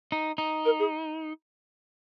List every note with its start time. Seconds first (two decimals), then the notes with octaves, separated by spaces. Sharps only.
0.12 D#4
0.38 D#4
0.65 A#4
0.79 G#4